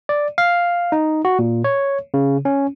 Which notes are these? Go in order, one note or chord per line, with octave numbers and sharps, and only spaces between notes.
D5
F5
D#4
F#4
A#2
C#5
C#3
C#4